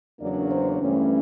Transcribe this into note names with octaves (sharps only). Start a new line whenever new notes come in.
E2 C#3 F#3 A#3 D4 D5
C5
G2 E3 A3 C#4